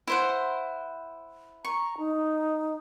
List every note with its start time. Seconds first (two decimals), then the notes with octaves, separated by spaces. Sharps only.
0.07 E4 C5 F#5
1.65 A#5 C#6
1.98 D#4